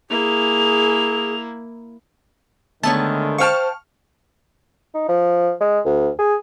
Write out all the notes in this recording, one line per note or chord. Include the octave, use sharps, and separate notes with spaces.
A#3 E4 G#4 F7
D3 D#3 G#3 A3 B3 C#5 A5
C5 F5 G5 A5 C#6 F6
D#4
F3
G#3
D2
G#4